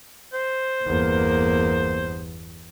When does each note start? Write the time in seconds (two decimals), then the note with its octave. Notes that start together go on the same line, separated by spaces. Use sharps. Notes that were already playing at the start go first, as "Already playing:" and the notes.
0.33 C5
0.83 G1 E2 A#3